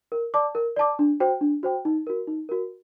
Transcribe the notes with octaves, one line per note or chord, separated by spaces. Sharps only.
A#4
D5 A5 D6
A#4
D5 A5 D6
D4
F#4 C5 G5
D4
F#4 C5 G5
D#4
F#4 A#4
D#4
F#4 A#4